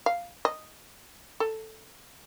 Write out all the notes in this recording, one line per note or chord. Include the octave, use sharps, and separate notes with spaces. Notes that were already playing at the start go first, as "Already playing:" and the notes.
F5
D#5
A4